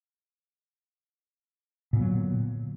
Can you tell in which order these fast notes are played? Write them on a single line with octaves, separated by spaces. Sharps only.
A#2 B3 F#3 D3